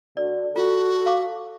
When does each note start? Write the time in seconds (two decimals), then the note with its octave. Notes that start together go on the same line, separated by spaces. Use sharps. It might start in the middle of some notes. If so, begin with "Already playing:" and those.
0.17 D3 F#4 D5
0.56 F4 F#4 A4
1.06 F5 C#6 D6